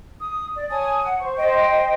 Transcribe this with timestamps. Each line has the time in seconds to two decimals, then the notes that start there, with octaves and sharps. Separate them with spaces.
0.19 D#6
0.54 D5
0.69 C#5 G#5 A5 D#6
1.02 F#5
1.20 C5 C#6
1.36 C5 D#5 G5